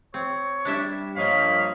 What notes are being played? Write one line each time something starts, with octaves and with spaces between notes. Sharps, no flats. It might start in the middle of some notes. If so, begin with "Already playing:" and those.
C4 C#5
G3 D4 E4 E5
G2 F3 A#3 C#5 D#5 F5 B5